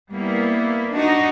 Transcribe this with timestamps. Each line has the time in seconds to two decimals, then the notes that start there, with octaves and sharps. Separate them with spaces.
0.12 G3 A#3 B3 E4
0.94 D4 D#4 F#4